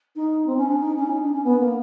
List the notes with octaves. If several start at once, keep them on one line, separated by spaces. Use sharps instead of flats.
D#4
C4
C#4
D4
D#4
C#4
E4
D#4
D4
C#4
B3
A#3